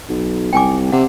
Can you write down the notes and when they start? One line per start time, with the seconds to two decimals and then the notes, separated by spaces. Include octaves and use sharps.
0.09 B1
0.53 C2 G5 G#5 D6
0.92 C3 F#5